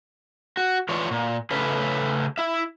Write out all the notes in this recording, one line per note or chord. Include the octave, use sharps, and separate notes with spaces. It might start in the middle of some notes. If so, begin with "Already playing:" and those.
F#4
E3 F4 C#5 D5
A#2
C#3 A3 C#4 B4
E4 E5